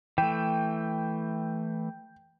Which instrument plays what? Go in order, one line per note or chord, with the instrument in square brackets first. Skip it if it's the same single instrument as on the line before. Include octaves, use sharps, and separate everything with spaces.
[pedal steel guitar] E3 A3 [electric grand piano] G5